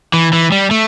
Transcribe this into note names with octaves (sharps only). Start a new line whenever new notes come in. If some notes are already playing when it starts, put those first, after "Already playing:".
E3
E3
G3
A3